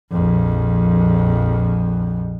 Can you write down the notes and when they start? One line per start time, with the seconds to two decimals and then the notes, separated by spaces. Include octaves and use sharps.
0.11 A#1 F2